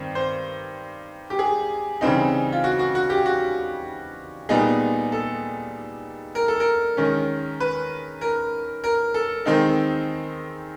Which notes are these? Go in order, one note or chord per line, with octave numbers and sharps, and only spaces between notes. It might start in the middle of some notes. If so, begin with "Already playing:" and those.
Already playing: G2 D#3 C4
C5
G4
G#4
C#3 E3 G3 C4 D#4
F4
F#4
F#4
F#4
G4
F#4
A#2 G3 B3 D#4 G#4
A4
A#4
A4
A#4
D#3 G#3 C#4
B4
A#4
A#4
A4
D#3 G#3 C4 D#4